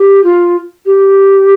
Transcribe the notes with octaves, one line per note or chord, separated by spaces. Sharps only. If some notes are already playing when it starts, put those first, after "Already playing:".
Already playing: G4
F4
G4